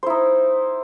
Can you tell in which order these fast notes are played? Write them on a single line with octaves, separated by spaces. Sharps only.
C5 E4 D#4